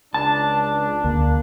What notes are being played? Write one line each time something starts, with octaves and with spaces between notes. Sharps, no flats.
C#2 D4 A5
D2 A#3